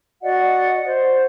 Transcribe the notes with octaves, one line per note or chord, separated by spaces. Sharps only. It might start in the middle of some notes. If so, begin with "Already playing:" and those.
F#4 D5 D#5 F#5
C5